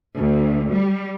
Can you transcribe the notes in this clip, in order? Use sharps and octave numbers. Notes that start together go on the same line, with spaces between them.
D2
G3